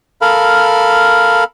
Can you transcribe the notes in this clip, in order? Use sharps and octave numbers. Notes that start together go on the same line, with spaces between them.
A4 A#4 F5 B5